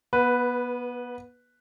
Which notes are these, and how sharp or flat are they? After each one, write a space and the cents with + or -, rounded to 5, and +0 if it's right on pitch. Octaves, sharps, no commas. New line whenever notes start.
B3 -25 B4 +0